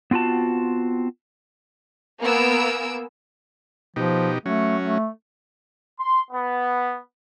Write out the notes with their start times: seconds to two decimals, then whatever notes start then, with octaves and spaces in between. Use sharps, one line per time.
0.11 B3 C4 F4 F#4 A5
2.22 A#3 B3 A#4 G#5 E6 D7
3.96 B2 F3 D#4 G4
4.46 F#3 A3 C#4
4.83 A3
6.00 C6
6.31 B3